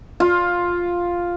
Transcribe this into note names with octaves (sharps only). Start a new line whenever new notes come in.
F4